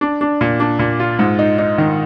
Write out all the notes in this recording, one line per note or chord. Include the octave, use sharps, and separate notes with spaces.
D4
D4
A#2
D4
A#2
F4
G#2
D#4
D#4
D#3